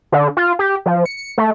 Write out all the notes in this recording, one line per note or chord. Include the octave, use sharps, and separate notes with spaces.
D3
F4
G4
F3
C#7
A3